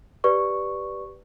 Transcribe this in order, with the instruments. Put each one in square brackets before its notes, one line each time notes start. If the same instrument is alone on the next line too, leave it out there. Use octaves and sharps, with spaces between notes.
[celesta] G4 B4 D5 C#6